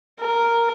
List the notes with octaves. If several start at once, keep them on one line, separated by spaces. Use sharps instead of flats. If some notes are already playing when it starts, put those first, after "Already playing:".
A#4